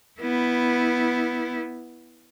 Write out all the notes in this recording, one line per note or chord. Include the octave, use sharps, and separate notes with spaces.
B3 E4